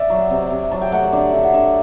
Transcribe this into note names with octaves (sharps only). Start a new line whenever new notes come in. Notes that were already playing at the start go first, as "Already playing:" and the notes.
Already playing: D5 E5
F#3
C3
C3
F#3 A5
G5
A3 F#5
E5
D3 D5
D3 E5
F#5
D3 E5